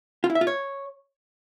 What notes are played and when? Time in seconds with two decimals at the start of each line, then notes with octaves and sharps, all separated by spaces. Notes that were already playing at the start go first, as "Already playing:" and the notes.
0.24 F4
0.30 E4
0.35 E5
0.41 F4
0.47 C#5